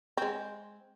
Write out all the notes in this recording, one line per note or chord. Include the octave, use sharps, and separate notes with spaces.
G#3 C4